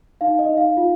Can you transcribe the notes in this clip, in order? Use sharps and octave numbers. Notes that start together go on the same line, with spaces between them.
D#4 F5
D#5
D#4
F5
F4